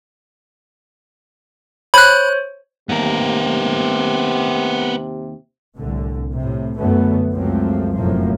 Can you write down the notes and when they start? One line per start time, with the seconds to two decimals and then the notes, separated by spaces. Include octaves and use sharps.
1.94 C5 C#5 B5 F#6
2.89 D#2 C3 B3 A#4
5.75 C2 A2 D3
6.35 A2 C3
6.78 F#2 D3 A3 B3 C#4
7.34 C#2 F#2 F3 F#3 A3 C4
7.94 F1 F#2 A2 F3 A#3